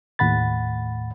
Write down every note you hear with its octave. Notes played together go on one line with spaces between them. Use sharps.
D#2 A2 F#5 B5 A6